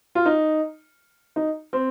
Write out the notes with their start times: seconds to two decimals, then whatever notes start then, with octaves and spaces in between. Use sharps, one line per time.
0.15 F4
0.25 D#4
1.36 D#4
1.73 C4